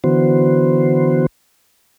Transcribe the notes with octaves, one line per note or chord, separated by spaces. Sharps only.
D3 E3 B3 F#4 C5